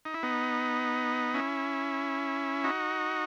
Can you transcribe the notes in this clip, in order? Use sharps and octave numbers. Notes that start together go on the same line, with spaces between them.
D#4
E4
B3 D#4
C#4 E4
D#4 F#4